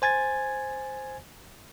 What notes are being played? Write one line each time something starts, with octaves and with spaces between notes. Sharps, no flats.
C5 G#5 G#6 A6